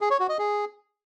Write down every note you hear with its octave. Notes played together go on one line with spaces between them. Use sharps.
G#4
C#5
F#4
D#5
G#4